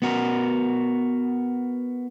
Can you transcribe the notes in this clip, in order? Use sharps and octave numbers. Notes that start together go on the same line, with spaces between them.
B3 F#4 A#4